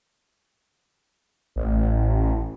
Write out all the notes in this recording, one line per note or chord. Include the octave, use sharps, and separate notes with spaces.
A1